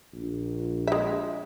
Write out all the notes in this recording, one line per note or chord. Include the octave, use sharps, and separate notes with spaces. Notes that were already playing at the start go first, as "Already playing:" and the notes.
A#1
G#3 E5